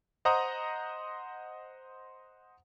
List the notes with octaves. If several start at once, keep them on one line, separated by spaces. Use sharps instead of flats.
C5 D#5 F#5 A#5 D#6